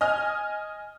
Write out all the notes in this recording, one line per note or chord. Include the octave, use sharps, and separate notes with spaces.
D#5 G#5 F6